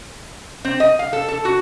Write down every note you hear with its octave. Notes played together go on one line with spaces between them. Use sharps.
C4
D#5
F5
A4
A4
F#4